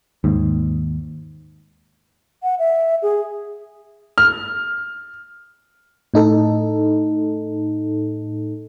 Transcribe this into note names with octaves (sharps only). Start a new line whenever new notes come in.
D#2 G#2
F#5
E5
G#4
F6
A2 D#4 A4